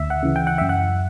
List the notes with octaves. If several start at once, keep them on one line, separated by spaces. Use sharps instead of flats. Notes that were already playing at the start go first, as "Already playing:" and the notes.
Already playing: D2 E5
F#5
C#3 E3
G5
F#5
F#2 E5
F#5